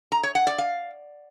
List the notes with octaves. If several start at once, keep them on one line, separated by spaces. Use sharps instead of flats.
A#5
C#5
F#5
D5
F5